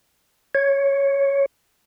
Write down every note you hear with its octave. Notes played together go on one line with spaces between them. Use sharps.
C#5